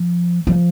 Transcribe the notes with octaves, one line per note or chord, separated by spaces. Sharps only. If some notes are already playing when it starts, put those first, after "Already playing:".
Already playing: F3
F3